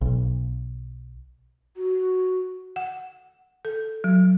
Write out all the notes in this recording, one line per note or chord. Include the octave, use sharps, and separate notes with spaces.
B1
F#4
F#5
A4
F#3